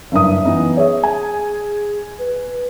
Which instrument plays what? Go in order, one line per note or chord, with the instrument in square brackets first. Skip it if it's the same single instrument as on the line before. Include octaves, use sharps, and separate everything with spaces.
[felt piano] F#1 G2 D#6 [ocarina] E5
[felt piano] E3 B3 D#4 [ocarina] C#4
[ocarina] G#4 [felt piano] C#5 E5
[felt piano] G#5
[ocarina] B4